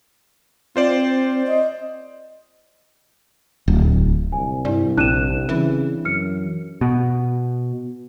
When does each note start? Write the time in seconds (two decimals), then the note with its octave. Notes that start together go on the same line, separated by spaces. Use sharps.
0.76 C4 F4 C5 D5
1.47 D#5
3.68 D1
4.32 C2 G#5
4.65 G2 E4 D5
4.97 A#1 C4 D4 F#6 D#7 E7
5.49 C#3 E3
6.05 F#2 F6 C#7
6.81 B2